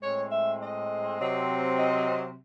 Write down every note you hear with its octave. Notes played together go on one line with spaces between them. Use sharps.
A2 G#3 C4 C#5
E5
D#5
C3 F#3 C4
D#5